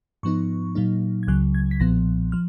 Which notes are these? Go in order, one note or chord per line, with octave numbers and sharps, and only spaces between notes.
G#2 F3 B3 D#4 C#6
A#2 F#3 A#3 D#4
G#6
C#2 C#3 F#3 F#6
G#6
B6
B1 A#2 F3 B3 A#6
F3 F6